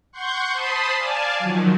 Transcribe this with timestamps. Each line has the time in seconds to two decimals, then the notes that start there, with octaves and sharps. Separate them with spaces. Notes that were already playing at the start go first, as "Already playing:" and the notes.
0.12 F#5 C6 C#6 G6
0.53 C5 A5 B5 C6 D#6
0.95 D5 F5 G#5 A5
1.39 D#3 F3 F#3